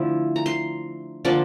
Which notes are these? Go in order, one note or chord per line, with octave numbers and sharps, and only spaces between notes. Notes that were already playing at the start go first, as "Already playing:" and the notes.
Already playing: D3 F3 A3 E4
A#5
C6
D3 F3 A#3 D4 D5